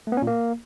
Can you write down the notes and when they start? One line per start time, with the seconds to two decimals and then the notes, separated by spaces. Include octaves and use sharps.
0.07 A3
0.12 B3
0.17 C#4
0.22 A#2
0.27 A#3